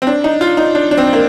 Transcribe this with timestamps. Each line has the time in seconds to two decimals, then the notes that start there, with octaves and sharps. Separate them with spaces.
0.02 C4
0.07 D4
0.24 D#4
0.41 F4
0.57 D#4
0.75 D4
0.91 D4
0.97 C4
1.13 A#3